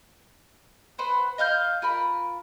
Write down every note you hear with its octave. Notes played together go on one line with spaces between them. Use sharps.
B4 C5 F#5
D#5 F5 F6 G6
F4 A#4 B5